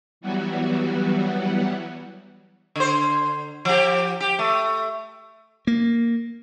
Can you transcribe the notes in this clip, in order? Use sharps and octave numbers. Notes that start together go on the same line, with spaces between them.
E3 F#3 G3 B3 F#4
D3 C5
F3 G4
G4
A3
A#3